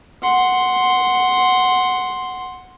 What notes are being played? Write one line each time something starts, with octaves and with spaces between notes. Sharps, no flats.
F#5 C6